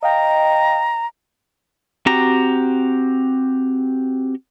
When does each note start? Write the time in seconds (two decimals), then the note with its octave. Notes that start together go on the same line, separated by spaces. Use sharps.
0.03 D#5 F5 G5 A#5
2.06 C4 F#4 G4 A#5